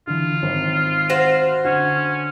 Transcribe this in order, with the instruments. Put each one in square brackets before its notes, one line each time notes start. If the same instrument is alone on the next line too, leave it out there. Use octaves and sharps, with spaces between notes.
[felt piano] D3 E3 [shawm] F4
[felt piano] G#1 C4
[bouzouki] F#4 C5 F5
[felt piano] D3 F#5 [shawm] C#4